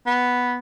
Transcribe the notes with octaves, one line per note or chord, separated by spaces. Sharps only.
B3